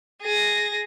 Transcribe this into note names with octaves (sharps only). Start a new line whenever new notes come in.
G#4 A#6